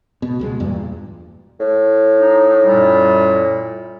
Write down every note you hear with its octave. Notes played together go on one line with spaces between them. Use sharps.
B2
C#2 B2 G#3
E2 G2 A#2
A2
D#4
F#2 A#2 G3